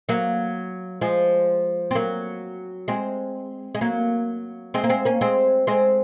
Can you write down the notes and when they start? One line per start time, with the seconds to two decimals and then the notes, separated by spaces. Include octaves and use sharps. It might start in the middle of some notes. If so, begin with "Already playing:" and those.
0.09 F#3 A#3
1.01 F3 G#3
1.91 C4
1.95 F#3 A#3
2.88 G#3 C4
3.75 G#3
3.81 F#3 A#3
4.74 G#3 C4
4.84 A#3
4.89 G#3 C4
5.05 A#3 C#4
5.21 G#3 C4
5.67 G#3 C4